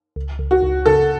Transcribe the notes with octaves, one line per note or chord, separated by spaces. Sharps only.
C#2
C#2
F#4
C#2
C#3 A4